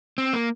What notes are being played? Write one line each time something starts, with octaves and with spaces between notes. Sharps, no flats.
C4
A#3